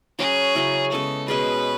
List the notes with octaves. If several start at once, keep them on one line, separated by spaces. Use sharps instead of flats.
F#3 C#4 F#4 G#4
C#3 F#3 C#4 E4
C#3 G#3 B3 A4
B2 G#3 C#4 G#4 B4